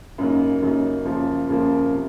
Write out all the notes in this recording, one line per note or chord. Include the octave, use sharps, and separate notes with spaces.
F#2 C#3 F#3 A#3 D#4
F#2 C#3 F#3 A#3 D#4
F#2 C#3 F3 A#3
F#2 C#3 F3 A#3
C3